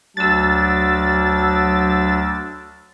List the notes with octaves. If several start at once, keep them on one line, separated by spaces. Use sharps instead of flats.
D2 F#3 D4 E6 A6